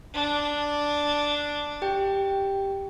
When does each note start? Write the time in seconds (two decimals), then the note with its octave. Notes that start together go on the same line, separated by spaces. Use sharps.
0.14 D4
1.82 G4 G5